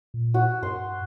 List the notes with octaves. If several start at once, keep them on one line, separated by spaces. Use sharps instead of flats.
A#2
F#4
G2 C6